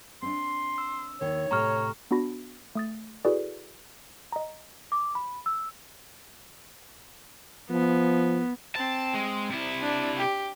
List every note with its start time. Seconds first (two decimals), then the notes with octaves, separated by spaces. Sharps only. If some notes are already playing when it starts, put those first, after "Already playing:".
0.22 C4 D4 C6
0.78 E6
1.21 D#2 D#3 C#5
1.51 A2 C3 A#5 C#6 F6
2.11 B3 D4 F#4 B5 A#6
2.75 A3 D#6 A6
3.25 E4 F#4 G#4 A4 B4 D5
4.32 D#5 A#5
4.92 D6
5.15 B5
5.46 E6
7.70 F3 B3
8.76 C4 A5
9.14 G#3
9.50 C3 E4
9.82 D4
10.17 G4